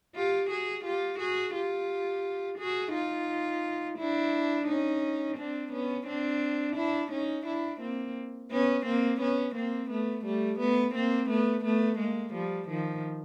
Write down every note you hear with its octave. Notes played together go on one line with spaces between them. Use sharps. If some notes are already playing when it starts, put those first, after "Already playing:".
F4 G4
F#4 G#4
F4 G4
F#4 G#4
F4 G4
F#4 G#4
D#4 F4
D4 E4
C#4 D#4
C4 D4
B3 C#4
C4 D4
D4 E4
C#4 D#4
D4 E4
A#3 C4
B3 C#4
A#3 C4
B3 C#4
A#3 C4
A3 B3
G3 A3
A3 B3
A#3 C4
A3 B3
A3 B3
G#3 A#3
F3 G3
D#3 F3